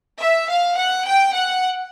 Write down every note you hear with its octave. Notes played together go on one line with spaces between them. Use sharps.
E5
F5
F#5
G5
F#5